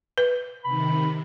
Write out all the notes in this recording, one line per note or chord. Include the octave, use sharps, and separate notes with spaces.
B4
C3 D#3 B5